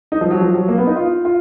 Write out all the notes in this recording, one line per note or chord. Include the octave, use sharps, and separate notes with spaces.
D#4
F3
F#3
F3
F#3
A#3
B3
D#4
F4
F4